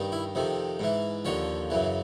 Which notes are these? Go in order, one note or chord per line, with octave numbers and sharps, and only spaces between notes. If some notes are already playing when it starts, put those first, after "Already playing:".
Already playing: G2 D#3
E4
F2 C3 D#3
G#2 E3
D#2 D3 F3 C#5
F#2 C#3 E3